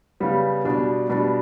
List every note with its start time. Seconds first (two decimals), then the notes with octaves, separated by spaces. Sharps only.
0.20 C#3 G3 B3
0.64 B2 G3 D4
1.10 B2 G3 D4